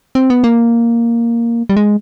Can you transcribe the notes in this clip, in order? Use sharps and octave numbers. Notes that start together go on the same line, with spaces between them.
C4
B3
A#3
G3
G#3